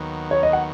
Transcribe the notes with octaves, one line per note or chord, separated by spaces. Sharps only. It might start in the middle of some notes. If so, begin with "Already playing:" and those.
Already playing: D#2 D#3 F#3 B3
C#5
D#5
F#5